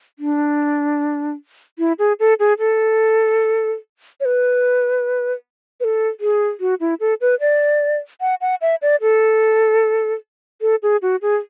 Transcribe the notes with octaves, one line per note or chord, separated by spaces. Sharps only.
D4
E4
G#4
A4
G#4
A4
C#5
B4
B4
A4
G#4
F#4
E4
A4
B4
D5
F#5
F#5
E5
D5
A4
A4
G#4
F#4
G#4